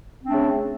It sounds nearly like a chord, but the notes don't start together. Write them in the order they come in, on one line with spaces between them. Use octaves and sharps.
C4 D4 A3 C#3